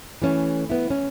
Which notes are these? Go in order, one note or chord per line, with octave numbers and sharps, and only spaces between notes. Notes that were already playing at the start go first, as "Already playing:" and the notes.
E3 A3 C#4
B3 E4
C#4